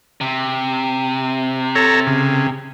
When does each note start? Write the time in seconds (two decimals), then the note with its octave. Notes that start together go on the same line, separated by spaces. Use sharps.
0.21 C3
1.75 A4 C#5 A#5
2.07 C#3